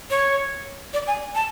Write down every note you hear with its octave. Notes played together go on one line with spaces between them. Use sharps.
C#5
D5
G#5
A5